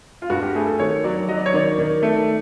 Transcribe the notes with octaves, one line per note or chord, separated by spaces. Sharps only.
F4
G2 F#4
G4
A3 G#4
A4
D#3 C#5
F#3 D5
F#3 D#5
D5
C#5
D#3 D5
D#3
A3